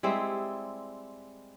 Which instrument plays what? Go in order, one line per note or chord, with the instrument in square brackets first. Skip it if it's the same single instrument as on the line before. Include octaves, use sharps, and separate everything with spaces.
[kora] G3 G#3 C4 E4